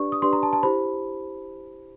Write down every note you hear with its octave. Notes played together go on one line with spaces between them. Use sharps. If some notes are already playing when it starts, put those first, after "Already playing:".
Already playing: D4 G4 B4 D5 C#6
D#6
D4 G4 B4 D5 C6
A#5
A5
A5
E4 G4 C5 B5